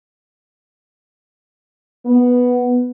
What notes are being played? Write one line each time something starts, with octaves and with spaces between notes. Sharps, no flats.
B3